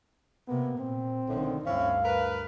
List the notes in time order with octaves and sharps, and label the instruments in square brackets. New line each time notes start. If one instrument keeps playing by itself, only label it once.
[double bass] C3 A#3 [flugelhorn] B3
[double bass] A#2 [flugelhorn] C4
[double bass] B1 D#3 [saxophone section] A2 D3
[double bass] D2 G2 [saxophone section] C4 C#4 E4 [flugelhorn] F5
[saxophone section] A#4 B4